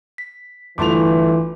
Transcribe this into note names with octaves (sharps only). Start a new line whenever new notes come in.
B6
G1 E3 A3 F4 C6 D6 F7